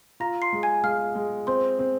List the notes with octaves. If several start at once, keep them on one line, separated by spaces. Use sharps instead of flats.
F4 A#5 A#6
C6 C7
G#3
G#5 G#6
G#3 F5 F6
G#3
C4 C5 C6
C4